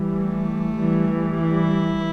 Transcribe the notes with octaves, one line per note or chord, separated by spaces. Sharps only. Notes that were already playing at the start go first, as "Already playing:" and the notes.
Already playing: E3 G3
A3
E3 G3
E4